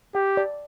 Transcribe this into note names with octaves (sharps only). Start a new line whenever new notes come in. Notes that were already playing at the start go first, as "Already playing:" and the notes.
G4 G5
D5